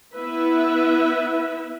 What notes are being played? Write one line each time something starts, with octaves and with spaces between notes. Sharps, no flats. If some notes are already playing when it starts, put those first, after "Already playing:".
B3 E4 B4 E5